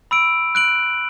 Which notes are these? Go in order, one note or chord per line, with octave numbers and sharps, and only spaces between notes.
B5 E6 D7
F#6 D7 F#7